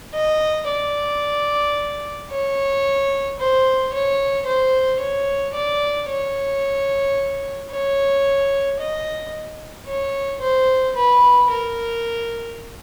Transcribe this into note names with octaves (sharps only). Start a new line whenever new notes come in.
D#5
D5
C#5
C5
C#5
C5
C#5
D5
C#5
C#5
D#5
C#5
C5
B4
A#4